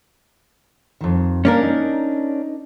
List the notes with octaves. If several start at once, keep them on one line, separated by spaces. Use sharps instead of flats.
F2 D#3
A#3 C#4 D4 A#4
D#4